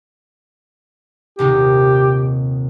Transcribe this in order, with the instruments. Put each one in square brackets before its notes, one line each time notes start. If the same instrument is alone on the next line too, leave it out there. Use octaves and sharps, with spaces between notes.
[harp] D#1 C3 D#4 [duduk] G4